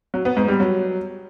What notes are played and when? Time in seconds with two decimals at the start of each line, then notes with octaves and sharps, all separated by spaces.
0.14 F#3
0.25 B3
0.37 G#2
0.48 G3
0.60 F#3